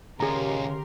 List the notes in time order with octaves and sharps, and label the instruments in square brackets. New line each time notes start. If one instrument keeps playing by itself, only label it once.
[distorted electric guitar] D#2 A#2 [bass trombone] C#3 [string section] G4 A#4 C6 [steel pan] G#4 A#5